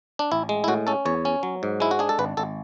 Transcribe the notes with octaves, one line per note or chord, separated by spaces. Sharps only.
D4
A1 E4
G#3
E4
A2 F#4
C#4 A4
E2 C#5
C#4
F#3
G#2
G#3 E4
F#4
D4 G#4
A4
G#1 B4
G#1 A4